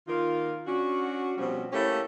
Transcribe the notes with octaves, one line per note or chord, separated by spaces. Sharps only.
D#3 A#3 F4
C#4 D4 F#4
B2 F3 G3 C4 C#4
A3 A#3 C#4 E4 G4